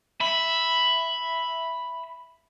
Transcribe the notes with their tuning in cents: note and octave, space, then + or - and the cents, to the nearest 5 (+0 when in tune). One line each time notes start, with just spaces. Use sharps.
E5 +0 B5 +0